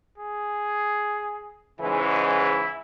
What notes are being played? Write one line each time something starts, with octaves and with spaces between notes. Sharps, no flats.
G#4
G#2 C#3 E3 E4